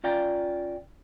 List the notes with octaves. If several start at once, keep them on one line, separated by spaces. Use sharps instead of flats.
C#4 F4 D5 G5 A#5